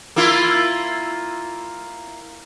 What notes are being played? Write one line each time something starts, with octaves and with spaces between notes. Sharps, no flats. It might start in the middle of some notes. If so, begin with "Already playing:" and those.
A#3 E4 F4